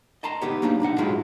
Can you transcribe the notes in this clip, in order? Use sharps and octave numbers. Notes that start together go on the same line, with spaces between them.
D#5 A5 A#5 C6
B3 D#4 G4 C#5
F#3 G3 A#3 D4 D#4 G4
B1 D4 D#4 F#5
A2 F#3 G#3 E4 F4 G4